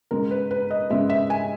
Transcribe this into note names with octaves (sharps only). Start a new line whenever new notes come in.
C#3 G#3 A#4
B4
B4
D#5
C#3 G#3 E5
E5
G#5